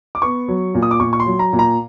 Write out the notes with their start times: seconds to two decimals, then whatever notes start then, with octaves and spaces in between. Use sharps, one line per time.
0.15 D6
0.22 B3 C#6
0.48 F#3
0.74 A#2
0.83 D#6
0.91 D6
1.00 A#2 C#6
1.13 C#6
1.20 C6
1.26 F#3
1.39 A#5
1.53 A#2
1.59 A#5